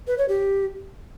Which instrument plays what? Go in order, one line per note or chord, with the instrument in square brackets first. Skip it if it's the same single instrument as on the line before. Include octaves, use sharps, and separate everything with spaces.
[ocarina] B4
C#5
G4